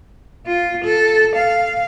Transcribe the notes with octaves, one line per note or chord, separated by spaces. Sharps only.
F4
A4
F5